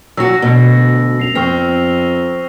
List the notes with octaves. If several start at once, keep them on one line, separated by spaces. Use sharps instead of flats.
F#3 F#4 E6 A#6
D2 B2
F#2 C7 F7
F2 C4 C#6 F6 C7